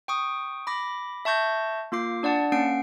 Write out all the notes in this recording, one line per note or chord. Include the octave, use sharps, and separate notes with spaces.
G5 C#6 D#6
B5 D6 A#6
E5 A5 C#6 G6 A#6
A#3 F4 D6 C7
D4 D5 F#5 A5
A#3 C#4 F#5 C7 D7